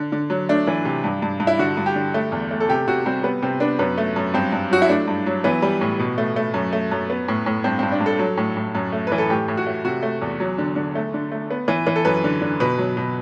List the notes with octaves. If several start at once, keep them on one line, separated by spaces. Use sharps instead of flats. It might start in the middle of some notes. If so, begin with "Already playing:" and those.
Already playing: D3
D3
F#3
A3 D4
E3
C3
G2
G2
G2
E4
D3 F#4
G2
G4
D3
A3
E2
A3
A4
C3 G4
C3 F#4
G3 C4
G3 B3
C3 C4
B3 D4
F#2 B3
A3
F#2
G2 C4
G2
F#3 F#4
E4
A3 D4
G2
F#3
E3 B3
G3
A2
B2
A3
A3
F#2
A3
F#2
B3
A2
A2
G2 C4
G2 C4
D4
G2
A4
F#3
A2
A2
F#2
A3
E3 B4
A4
A2 G4
A2
F#4
A3
C3 F#4
A3
E2
F#3
D3
D3
A3
D3
A3
B3
E3
E3
A4
F#2 B4
D3
D3
B2 B4
F#3
B2